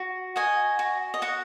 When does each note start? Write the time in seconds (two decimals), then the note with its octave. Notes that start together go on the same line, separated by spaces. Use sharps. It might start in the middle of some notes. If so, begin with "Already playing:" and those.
Already playing: F#4
0.36 F#4 D#5 G#5
0.79 F#4
1.14 D#5
1.22 F#4 F#5